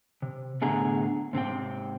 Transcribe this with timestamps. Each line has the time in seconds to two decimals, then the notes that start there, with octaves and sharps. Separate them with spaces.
0.22 C3
0.62 A2 D3 B3 G#4 E5 A#5
1.33 G#2 C3 C4 G5